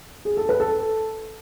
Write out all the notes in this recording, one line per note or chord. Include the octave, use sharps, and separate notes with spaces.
G#4
A4
B4
A4